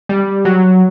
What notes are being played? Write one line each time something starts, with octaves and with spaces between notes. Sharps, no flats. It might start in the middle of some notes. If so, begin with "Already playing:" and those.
G3
F#3